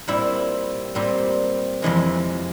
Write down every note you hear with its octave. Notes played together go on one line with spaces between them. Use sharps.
A#2 G3 C4 E4
A#2 G3 C4
F2 C3 E3 G#3